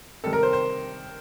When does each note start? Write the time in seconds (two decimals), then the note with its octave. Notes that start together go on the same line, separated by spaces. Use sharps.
0.24 C3 D#3 G3 A4
0.33 A#4
0.43 C5
0.53 C5